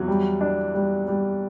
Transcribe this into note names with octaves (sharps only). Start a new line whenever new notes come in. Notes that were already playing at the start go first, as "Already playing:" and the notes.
Already playing: E2 F#3
G3
D4
G3
G3